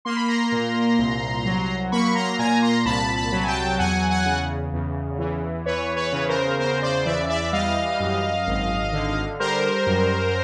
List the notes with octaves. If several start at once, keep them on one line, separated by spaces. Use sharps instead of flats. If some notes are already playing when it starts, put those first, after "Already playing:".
A#3 C6
B5
A#5 C6
A#2
C2
F#3
A#3 B5 C#6
A#5 C6
A#2 G#5 A#5
A#5 C6
C2 A5 B5
A5 B5
F#3
G#5
G5 A5
E2 F#5 G#5
F#5 G#5
C#3
E2
E3
E2 B4 C#5
B4 C#5
C#3
A#4 C5
E2 A#4 C5
C5 D5
E3 D5 E5
D5 E5
G3 D#5 F5
F#2
G#1
D3
G3 A#4 C5
F#2